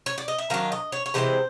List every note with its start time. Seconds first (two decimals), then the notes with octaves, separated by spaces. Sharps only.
0.06 C#5
0.18 D5
0.28 D#5
0.38 E5
0.50 D#3 F#3 D4 F5
0.72 D#5
0.92 C#5
1.06 C#5
1.14 C3 E3 G#3 C4 C5